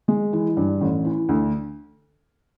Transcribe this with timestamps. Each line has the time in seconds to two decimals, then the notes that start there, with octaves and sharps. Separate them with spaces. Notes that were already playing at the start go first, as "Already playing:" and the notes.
0.08 G#3
0.33 E3
0.57 G2
0.81 A1
1.05 E3
1.29 D2